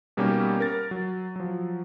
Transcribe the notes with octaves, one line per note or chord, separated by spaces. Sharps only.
B2 G3 A#3 C#4 D#4 G4
A#4 A6
F#3
F3 F#3